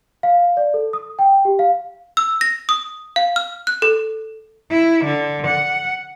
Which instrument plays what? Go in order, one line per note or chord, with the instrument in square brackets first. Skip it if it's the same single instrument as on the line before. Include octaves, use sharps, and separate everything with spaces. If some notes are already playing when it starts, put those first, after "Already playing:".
[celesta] F5
D5
A4
D#6
G5
G4
F5
[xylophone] E6
A#6
D#6
F5
F6
F#6
A4
[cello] E4
D3
F#5